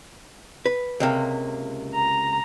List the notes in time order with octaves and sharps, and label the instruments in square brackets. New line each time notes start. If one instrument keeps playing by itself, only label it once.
[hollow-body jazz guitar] B4
C#2 C3 A#3
[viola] A#5